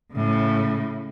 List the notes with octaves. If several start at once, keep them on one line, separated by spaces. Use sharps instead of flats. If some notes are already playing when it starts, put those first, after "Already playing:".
A2 C#3